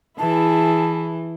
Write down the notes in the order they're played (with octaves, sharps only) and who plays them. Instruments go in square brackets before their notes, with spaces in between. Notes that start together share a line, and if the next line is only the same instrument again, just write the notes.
[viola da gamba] E3 [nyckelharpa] E4 G#4 [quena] A5